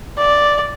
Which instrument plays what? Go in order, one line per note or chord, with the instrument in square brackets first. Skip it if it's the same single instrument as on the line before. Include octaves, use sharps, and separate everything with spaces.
[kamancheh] D5